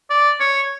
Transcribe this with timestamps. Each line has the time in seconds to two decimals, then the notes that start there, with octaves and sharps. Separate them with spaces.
0.10 D5
0.40 C#5